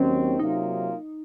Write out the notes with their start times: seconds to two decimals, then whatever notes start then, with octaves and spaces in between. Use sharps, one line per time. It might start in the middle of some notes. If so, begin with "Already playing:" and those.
Already playing: D#2 D#3 F#3 C4 C#4
0.39 C3 F#3 A#3 D#4 F4